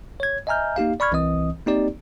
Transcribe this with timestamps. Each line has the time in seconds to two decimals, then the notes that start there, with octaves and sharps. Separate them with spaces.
0.20 C#5 G#6
0.47 D#5 E5 G#5 A#5 F6 G6
0.76 A#3 D#4 G4 F5
1.00 D5 B5 C#6 F6 G#6
1.12 C2 E3 C4 D#5 D#6
1.66 A#3 C4 D#4 G4 D5